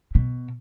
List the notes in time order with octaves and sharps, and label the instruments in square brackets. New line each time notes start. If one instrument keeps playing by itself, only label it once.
[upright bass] B2